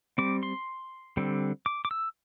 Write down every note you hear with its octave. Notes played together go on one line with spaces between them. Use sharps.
G3 C4 D6
C6
D3 G3 C4
D6
D6
E6